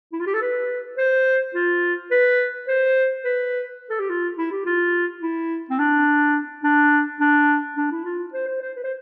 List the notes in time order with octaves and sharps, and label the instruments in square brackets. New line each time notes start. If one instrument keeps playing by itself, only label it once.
[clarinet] E4
F4
G4
A4
B4
C5
F4
B4
C5
B4
A4
G4
F4
E4
G4
F4
E4
C4
D4
D4
D4
D4
E4
F4
C5
C5
C5
B4
C5